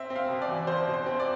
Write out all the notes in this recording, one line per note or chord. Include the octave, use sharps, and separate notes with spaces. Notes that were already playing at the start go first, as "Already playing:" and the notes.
Already playing: C4 E5
C4
F5
B2
D5
E2
B2 C5
B2
C5
C4
D5